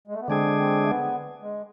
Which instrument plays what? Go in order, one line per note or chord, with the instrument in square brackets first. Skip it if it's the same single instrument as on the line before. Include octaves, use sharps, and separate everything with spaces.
[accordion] G#3
A3
B3
[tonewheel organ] D3 G#3 D4 G#4 [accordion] C4
[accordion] C4
A3
B3
G#3